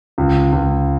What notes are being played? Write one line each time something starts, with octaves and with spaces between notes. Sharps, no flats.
C#2
C#2